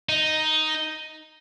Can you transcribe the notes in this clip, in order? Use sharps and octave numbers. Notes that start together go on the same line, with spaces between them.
D#4